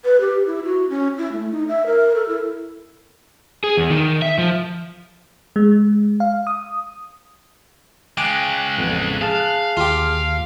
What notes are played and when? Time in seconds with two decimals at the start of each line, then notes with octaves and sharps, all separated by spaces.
0.05 B4
0.21 G4
0.46 E4
0.64 F#4
0.90 C#4
1.18 E4
1.32 A3
1.51 D#4
1.68 E5
1.86 A#4
2.15 A4
2.28 E4
3.64 G#4
3.77 E2
3.90 D#3
4.22 E5
4.38 F3
5.56 G#3
6.20 F5
6.47 D#6
8.18 C#3 G#3 G5 G#5 D6 F#6
8.77 A1 F2 B3
9.21 G#4 F5 A5 F6
9.77 D#2 F4 G4